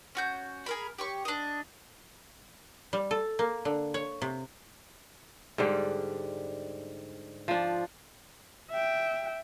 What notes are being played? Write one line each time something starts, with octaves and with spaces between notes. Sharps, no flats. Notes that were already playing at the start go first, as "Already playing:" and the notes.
C#4 F#4 G6
G#4 A#4 B5
G4 C#5 C#6
D4 D#5
G3
A4
A#3
D3
C#5
C3
G#2 D3 G3
F3 D4
E5 G5